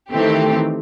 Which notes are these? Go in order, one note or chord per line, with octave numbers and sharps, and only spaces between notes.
D#3 E3 A3 C4 G4